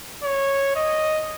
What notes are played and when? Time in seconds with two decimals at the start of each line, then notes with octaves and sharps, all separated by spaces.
0.24 C#5
0.76 D#5